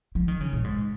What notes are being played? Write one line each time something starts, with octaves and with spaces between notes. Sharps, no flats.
F3
D#3
C#3
A#2
G#2